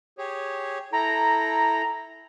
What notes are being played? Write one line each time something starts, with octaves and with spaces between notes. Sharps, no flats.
G4 G#4 C#5
E4 A4 G5 A#5